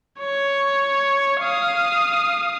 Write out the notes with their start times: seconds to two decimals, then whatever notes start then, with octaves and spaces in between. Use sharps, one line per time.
0.20 C#5
1.42 F5 D#6